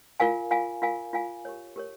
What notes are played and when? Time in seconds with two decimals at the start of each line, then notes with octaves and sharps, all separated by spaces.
0.20 F4 A#4 F5 G#5
0.51 F4 A#4 F5 G#5
0.82 F4 A#4 F5 G#5
1.13 F4 A#4 F5 G#5
1.45 G4 A#4 C#5
1.76 G4 A#4 C#5